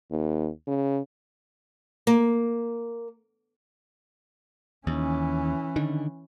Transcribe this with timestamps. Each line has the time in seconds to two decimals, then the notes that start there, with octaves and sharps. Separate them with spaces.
0.11 D#2
0.67 C#3
2.07 A#3
4.87 D#2 E3 C#4
5.76 D3 D#3